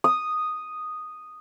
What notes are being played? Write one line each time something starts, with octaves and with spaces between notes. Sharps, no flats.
D#6